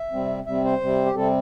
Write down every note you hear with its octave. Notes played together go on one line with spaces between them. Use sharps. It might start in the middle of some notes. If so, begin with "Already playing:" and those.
Already playing: E5
C3 G3 C4
C3 G3 C4 E5
C5
C3 G3 C4
G4
C3 G3 C4 A4